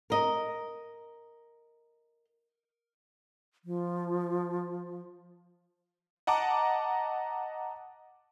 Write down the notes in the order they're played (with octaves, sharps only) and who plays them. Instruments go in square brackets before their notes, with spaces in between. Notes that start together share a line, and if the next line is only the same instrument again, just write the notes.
[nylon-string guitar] A#4 D#5
[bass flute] F3
[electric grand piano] D#5 F#5 A5 A#5 D6